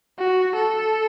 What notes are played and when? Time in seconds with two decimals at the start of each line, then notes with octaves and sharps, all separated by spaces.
0.19 F#4
0.56 A4